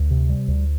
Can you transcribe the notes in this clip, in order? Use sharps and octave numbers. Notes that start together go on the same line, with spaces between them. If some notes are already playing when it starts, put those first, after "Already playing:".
Already playing: D2
C3
G3
D2